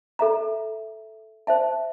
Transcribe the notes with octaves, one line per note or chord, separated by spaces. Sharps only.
A4 E5 A#5
C5 E5 A5